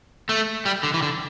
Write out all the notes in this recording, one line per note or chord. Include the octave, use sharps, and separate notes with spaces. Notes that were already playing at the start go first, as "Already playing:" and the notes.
A3
G3
D3
E3
D3